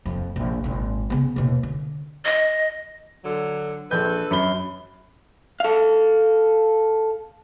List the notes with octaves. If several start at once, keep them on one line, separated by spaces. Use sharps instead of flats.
D#1 F2
A#1 F#2
G#1 A#2
C#3 B3
D#2 B2
D3
D#5
D3 F#3
A#1 A4 B4 G6
F#2 B5 G7
A4 F5